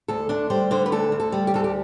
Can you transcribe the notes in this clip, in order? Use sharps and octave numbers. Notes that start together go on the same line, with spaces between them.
D2 A4
D2 D4
G3 C5
D3 C5
B4
D2 A4
D2
A4
G3
G4
D2 A4
G4